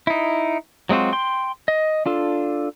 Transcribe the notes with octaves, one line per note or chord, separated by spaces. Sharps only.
D#4 E4
F#3 G#3 C4 F4 F#4
G5 C6
D#5
D4 F4 A4